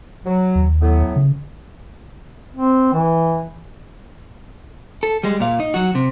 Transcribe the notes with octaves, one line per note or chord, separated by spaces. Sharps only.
F#3
D#2
A2 F#3 B3
C#3
C4
E3
A4
G3 G#3
A#2 F5
D#4
F#3 F#4
C3